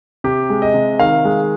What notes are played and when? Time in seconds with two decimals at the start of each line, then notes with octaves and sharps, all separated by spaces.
0.24 C3 G4
0.50 G#3
0.62 D#5
0.74 C3
0.99 D#3 F5
1.25 G#3